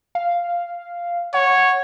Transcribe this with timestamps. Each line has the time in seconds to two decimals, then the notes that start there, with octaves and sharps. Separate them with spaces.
0.15 F5
1.34 C#5 F#5